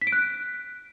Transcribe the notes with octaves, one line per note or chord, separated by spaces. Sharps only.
B6
D7
F#6